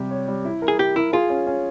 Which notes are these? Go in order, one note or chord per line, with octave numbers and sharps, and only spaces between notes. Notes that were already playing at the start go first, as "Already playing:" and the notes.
Already playing: C3 G3 G4
C#5
G3
E4
A#4
G#4
G4 A#4
E4 A#4
F4 G#4
C#4
C#4